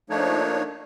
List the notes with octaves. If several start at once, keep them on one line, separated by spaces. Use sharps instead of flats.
F3 A3 A#3 D4 D#4 C#5